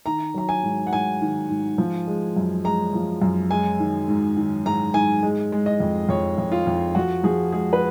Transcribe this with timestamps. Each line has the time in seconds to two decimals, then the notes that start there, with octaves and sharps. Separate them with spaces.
0.06 D#3 A#5
0.34 F#3 A#5
0.49 G#5
0.64 G#2
0.87 F#5
0.93 G#2 G#5
1.22 D#3
1.50 G#2
1.78 F3
2.07 G#3
2.36 F#2
2.64 G#3 A#5
2.94 F3
3.22 F#2
3.51 G#3 G#5
3.80 D#3
4.08 G#2
4.37 D#3
4.66 G#2 A#5
4.94 G#2 G#5
5.23 G#3
5.52 G#3
5.66 D#5
5.80 F2
6.09 F2 C#5
6.38 F2
6.52 F4
6.67 F2
6.95 F3 F#4
7.24 F3 G#4
7.52 G#3 G#4
7.73 B4